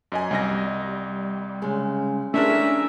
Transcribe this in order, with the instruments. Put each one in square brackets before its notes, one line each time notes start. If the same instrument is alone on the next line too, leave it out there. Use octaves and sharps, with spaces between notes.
[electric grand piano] F#2 D#5 G#5
[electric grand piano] C2 D#5 A#6 [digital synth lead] G3
[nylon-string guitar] C#3 G#3 C#4
[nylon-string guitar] F3 E4 G#4 [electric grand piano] A3 D4 A#4 [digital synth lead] C#4 [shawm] E5